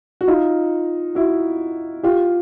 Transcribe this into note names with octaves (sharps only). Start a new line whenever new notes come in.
F#4
D#4 F4
E4 F#4
F4 G4